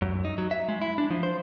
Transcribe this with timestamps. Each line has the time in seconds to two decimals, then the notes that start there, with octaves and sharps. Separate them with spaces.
0.02 F#2
0.25 D#4
0.38 F#3
0.51 E5
0.69 G#3
0.82 E4
0.98 D4
1.10 F3
1.23 C5